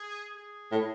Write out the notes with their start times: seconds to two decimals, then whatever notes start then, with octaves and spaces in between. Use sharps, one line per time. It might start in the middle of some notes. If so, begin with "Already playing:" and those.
Already playing: G#4
0.37 G#4
0.72 A2